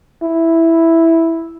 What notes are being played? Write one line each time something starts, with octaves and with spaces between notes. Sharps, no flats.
E4